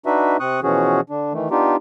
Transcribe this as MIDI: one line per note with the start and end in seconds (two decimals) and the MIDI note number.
0.06 0.37 62
0.06 0.37 63
0.06 0.37 66
0.06 0.37 71
0.06 0.37 76
0.40 0.60 48
0.40 0.60 60
0.40 0.60 85
0.40 0.60 87
0.40 0.60 90
0.63 1.01 47
0.63 1.01 52
0.63 1.01 53
0.63 1.01 61
0.63 1.01 66
0.63 1.01 68
1.10 1.33 50
1.10 1.33 62
1.33 1.49 51
1.33 1.49 52
1.33 1.49 57
1.51 1.76 59
1.51 1.76 62
1.51 1.76 63
1.51 1.76 65
1.51 1.76 67